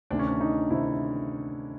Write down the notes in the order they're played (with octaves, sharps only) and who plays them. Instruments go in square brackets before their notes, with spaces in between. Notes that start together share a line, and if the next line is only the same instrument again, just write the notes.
[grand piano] D2 C3 D#3 D4
C#4
D4
D#4
D2 C3 D#3 E4